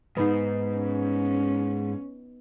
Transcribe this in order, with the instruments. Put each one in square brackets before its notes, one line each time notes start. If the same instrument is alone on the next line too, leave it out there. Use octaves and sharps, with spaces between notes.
[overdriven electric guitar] G#2 [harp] B3 D#4 C7
[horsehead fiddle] C#4